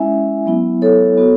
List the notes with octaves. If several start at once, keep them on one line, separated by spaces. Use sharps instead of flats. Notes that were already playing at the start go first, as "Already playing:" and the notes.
Already playing: G#3 C#4 E4 E5 G#5
F#3 B3 E4
A4 C#5
B3 F#4